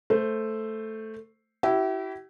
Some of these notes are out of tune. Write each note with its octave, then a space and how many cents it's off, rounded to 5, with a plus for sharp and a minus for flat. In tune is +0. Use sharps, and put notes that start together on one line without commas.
A3 +0 C5 +0
E4 +0 G4 -45